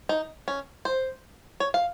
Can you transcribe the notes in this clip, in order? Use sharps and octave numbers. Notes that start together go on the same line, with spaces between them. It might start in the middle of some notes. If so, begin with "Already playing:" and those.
D#4
C#4
C5
C#5
F5